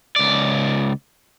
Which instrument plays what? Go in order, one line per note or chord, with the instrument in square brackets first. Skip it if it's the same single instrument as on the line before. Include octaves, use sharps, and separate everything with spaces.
[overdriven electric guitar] C#2 D5